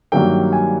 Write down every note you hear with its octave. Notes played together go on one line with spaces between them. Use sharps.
G2 D#3 F#3 A#3 G5
G#5